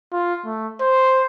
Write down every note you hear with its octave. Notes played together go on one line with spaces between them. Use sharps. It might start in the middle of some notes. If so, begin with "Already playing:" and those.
F4
A3
C5